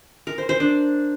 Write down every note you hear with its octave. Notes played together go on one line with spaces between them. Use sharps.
A#4
C5
C5
D4